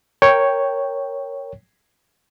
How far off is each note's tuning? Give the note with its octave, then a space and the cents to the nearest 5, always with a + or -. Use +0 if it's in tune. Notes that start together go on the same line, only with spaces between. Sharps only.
A#4 +0 C#5 +0 G5 +0